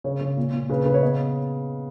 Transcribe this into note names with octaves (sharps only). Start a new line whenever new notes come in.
C#3 C#5
C#3
A#2
A#2
C#3 B4
C#3 B4
C#5
B3 D#5